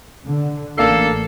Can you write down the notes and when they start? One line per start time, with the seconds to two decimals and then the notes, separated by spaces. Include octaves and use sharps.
0.25 D3
0.78 A1 A#3 D4 A4 C7